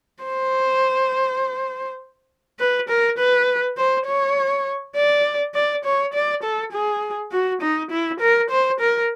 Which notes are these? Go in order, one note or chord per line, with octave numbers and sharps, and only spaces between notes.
C5
B4
A#4
B4
C5
C#5
D5
D5
C#5
D5
A4
G#4
F#4
D#4
E4
A#4
C5
A#4